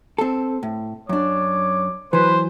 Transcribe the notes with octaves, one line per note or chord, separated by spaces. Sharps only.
C4 A4
A2
F#2 D4 C#5 D6
E3 F#3 B4 C5